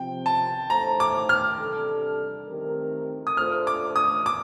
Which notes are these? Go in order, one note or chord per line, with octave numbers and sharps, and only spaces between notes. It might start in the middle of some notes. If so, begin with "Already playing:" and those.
Already playing: C3 F3 C4 G5
A5
A3 D#4 A4 C5 A#5
D6
F6
C3 G3 D4 A4
D#3 A3 C4 G4 A#4
D#6
A3 D4 F4 A4 C5 F6
D6
D#6
D6